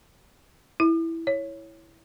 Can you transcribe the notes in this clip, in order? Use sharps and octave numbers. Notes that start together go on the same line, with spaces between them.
E4
C#5